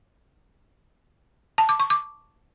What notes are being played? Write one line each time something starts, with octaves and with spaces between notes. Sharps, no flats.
A5
D6
C#6
D6